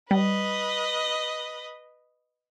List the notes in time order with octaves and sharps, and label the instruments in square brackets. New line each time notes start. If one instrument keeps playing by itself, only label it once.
[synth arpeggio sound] G3 [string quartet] B4 D#5